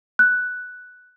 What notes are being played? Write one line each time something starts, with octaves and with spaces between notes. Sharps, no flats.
F#6